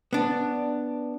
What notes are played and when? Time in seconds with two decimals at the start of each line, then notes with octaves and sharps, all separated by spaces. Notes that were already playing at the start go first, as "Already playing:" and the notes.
0.13 B3 D4